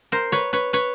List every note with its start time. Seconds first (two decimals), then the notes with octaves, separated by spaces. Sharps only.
0.12 A#4 C5
0.32 B4 C#5
0.53 B4 C#5
0.73 B4 C#5